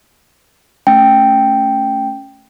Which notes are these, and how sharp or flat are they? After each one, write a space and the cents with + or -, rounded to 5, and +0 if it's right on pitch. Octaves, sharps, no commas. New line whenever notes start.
A3 +0 C#4 +0 G5 +0